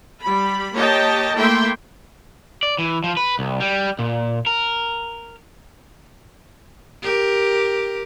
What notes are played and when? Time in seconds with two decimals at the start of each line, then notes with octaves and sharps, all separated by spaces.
0.22 G3 B5
0.75 A#3 G4 C#5 D#5 G5 A5
1.35 A3 A#3 E4 E5 G5 C6
2.63 D5
2.79 E3
3.04 F3
3.17 B4
3.39 C2
3.60 G3
3.99 A#2
4.47 A#4
7.03 G4 A#4